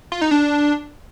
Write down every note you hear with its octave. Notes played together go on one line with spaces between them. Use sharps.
F4
D#4
D4